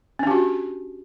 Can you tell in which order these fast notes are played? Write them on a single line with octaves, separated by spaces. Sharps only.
C#4 D4 G4 F#4